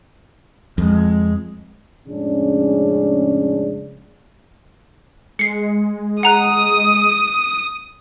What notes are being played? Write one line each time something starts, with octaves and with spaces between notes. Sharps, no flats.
F2 G#3
F2 A2 C#3 G#3 C#4 D4
G#3 C7 C#7
F#5 A#5 D#6 F#6